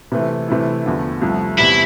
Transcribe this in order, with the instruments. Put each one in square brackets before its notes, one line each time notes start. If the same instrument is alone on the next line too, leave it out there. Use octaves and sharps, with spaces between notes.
[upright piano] C3 E3 A3
C3 E3 A3 E4
E2 D3 F3 A3
C2 C3 F3 A3
[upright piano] E2 C3 G3 [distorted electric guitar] E4